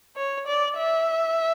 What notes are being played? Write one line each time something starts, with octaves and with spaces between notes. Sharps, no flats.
C#5
D5
E5